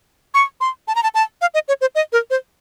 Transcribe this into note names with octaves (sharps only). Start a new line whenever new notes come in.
C#6
C6
A5
A#5
A5
A5
F5
D#5
C#5
C5
D#5
A#4
C5